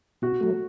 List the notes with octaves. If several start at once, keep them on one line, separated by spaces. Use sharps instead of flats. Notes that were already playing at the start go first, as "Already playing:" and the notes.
B2 F#4
F#3 A3